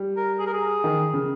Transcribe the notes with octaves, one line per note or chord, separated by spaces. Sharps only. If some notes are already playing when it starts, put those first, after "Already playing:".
Already playing: G3
A#4
G#4
A#4
G#4
D#3
C#3